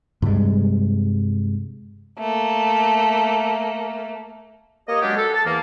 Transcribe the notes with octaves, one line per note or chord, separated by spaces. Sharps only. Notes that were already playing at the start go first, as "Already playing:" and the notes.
G2 C3 G3 G#3
A3 A#3
A#3 G4 C#5 D#5
F#3 G#3 C#4 D4 G4
A4
A5
E2 E3 A#3